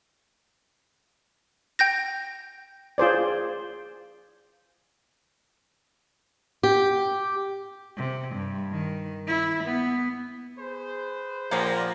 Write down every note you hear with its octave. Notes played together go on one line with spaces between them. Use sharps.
G5 G6 A#6
F4 G#4 C5 D5
G4
C3
G2
D#3
E4
B3
G#4 B4 C5
A#2 D3 F3 G3 A#3